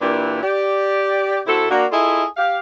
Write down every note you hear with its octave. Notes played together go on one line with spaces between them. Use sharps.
A#2 E3 A#3 D4 E4 G4
G4 D5
C3 E4 F#4 A4
A#3 D4 F#4
E4 F4 G#4 A4 D#5 E5
G4 F5